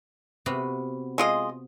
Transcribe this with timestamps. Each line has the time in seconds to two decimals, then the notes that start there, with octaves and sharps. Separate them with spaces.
0.46 C3 B3 F#4
1.18 G#3 F4 D#5